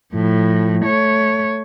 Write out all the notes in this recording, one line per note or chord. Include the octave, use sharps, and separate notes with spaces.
A2 F3
A3 C#5